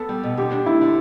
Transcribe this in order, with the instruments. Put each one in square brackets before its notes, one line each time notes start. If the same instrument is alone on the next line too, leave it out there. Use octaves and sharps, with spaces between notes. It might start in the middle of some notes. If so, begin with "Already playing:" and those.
Already playing: [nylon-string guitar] B3 [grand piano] A4
[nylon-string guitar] G3
B2
[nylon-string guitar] D3 [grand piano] G4
[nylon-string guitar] D4
[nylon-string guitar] A3 [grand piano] E4
[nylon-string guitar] D3